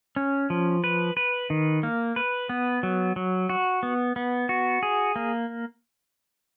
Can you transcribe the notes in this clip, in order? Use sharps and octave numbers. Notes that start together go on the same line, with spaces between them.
C#4
F3
B4
B4
D#3
A#3
B4
B3
F#3
F#3
F#4
B3
B3
F#4
G#4
A#3